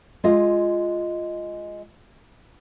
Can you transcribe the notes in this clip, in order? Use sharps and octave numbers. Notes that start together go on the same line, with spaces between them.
G#3 F4 D#5